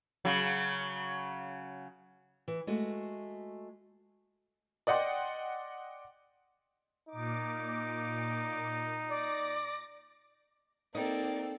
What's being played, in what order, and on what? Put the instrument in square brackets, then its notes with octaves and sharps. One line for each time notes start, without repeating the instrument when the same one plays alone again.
[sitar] C#3 F#3
[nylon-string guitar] E3
G#3 A3 F#4 G#4
[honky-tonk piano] D5 D#5 F#5 G5 C6
[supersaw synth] A#2 D6 [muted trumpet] D#4
[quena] D5 [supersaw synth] D6 A#6
[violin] A#3 D5 [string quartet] C4 A4 [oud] D#4